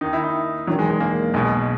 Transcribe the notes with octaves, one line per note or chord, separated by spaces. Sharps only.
D#2 D#3 D#4
E4
D#4
E1 E2 D#3 F#3
G#3
G#3
A#3
B1 B2 G#3